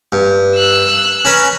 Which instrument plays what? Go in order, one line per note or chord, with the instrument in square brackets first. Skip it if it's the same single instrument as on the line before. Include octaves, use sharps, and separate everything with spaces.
[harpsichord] G2
[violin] E6 F#6
[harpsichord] C#4 A#4 B4